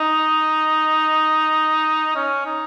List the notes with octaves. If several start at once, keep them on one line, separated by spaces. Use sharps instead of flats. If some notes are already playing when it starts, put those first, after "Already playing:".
Already playing: D#4
C#4
D#4